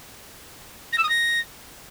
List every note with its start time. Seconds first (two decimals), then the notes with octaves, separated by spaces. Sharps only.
0.92 A#6
0.98 E6
1.03 D#6
1.09 A#6